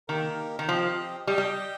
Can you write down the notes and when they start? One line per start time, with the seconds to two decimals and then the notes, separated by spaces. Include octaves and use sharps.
0.08 D#3 A#3 D#4 G4 A#4
0.59 D#3
0.69 F3 C4 G4 D#5
1.27 G3 G4 D#5 G5
1.38 G3